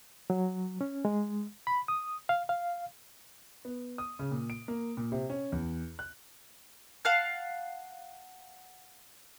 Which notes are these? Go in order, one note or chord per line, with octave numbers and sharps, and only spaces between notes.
F#3
C#4
G#3
B5
D#6
F5
F5
B3
D#6
C#3
A#2
D7
A#3
A#2
C3
C#4
E2
F#6
F5 F#5 A5 F6